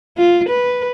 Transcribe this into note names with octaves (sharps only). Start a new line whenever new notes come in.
F4
B4